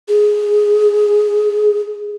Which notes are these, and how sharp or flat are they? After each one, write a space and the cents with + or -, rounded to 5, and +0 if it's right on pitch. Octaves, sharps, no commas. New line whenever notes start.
G#4 +5